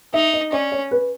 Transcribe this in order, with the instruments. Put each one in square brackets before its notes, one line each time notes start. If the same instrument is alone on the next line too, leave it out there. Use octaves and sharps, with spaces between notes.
[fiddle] D#4 [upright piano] E5
[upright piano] D#5
[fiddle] C#4 [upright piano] D5
[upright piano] C#5
B4